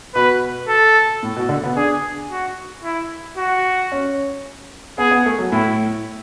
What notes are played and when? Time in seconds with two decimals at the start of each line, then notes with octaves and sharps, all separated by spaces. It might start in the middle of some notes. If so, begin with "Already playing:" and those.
0.15 B2 B4
0.69 A4
1.23 A2
1.36 B2
1.49 D3
1.64 B3
1.76 D4 G#4
2.30 F#4
2.84 E4
3.37 F#4
3.92 C#4
4.98 B3 G#4
5.11 B3
5.26 A3
5.39 F#3
5.52 A2 E4